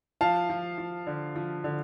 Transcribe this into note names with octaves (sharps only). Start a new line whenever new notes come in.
F3 F5 A5
F3
F3
D3
F3
D3